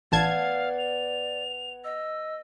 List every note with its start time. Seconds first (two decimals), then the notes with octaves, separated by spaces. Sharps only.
0.12 A1 B3 D5 F5 A5 G#6
0.78 F7
1.84 D#5 E6